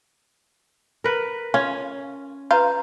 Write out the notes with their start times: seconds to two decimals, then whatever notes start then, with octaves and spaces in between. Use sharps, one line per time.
1.04 A#4 B4
1.54 C#4 F4
2.51 F4 B4 A#5 G6